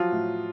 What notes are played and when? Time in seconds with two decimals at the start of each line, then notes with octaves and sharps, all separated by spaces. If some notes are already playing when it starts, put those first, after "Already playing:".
Already playing: F3 F#3 F4
0.12 A2